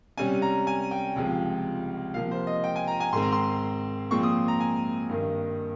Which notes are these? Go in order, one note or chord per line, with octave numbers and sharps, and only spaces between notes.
C3 G3 C#4 G#5
A#5
G#5
G5
C#2 C3 F3 G#3
C3 F3 A#3 F5
C5
D#5
G5
G#5
A#5
G#5
G#2 D#3 G#3 C4 C6
A#5
C6
A#2 F3 G#3 C4 C#6
D#6
A#5
G#5
G2 D#3 A#3